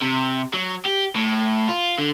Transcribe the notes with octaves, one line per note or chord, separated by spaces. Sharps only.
C3
F#3
G4
A2
F4
D3